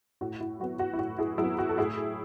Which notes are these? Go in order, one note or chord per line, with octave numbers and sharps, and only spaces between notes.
A2 F#4
E4
F#3 B3 F#4
F#4
E4
A2 F#4
E4 G#4
F#3 E4 G#4
B3
F#4
A4
A2 E4 G#4